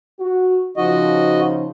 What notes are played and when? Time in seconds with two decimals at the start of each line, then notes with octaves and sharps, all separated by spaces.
0.20 F#4
0.77 C#3 F3 D#4 F#4 D#5